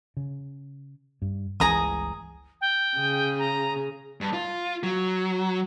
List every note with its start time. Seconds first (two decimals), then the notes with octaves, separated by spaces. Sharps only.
0.17 C#3
1.22 G2
1.60 G1 C#2 E3 G#4 A#5 D#6
2.61 G5
2.97 C#3 G#4
3.39 A#5
4.21 G2
4.34 F4
4.83 F#3